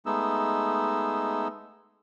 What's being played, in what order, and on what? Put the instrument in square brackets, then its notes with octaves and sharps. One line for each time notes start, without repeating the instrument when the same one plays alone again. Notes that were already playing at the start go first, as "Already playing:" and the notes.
[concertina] G#3 A3 B3 D#4 E6